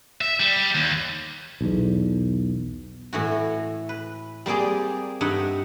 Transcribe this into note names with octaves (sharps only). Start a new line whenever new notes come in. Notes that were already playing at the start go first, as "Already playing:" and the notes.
E5
G3
D#2
B1 E2
A2 E3 F#4
B4
G3 A#3 C4 G#4 D5
G2 D#4 E5 F#5